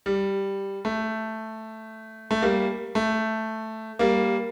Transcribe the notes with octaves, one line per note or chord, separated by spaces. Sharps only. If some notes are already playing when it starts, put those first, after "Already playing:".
G3
A3
A3
G3 A#3
A3
G3 A#3